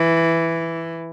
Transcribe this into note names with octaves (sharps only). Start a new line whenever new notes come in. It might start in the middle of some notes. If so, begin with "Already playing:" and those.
Already playing: E3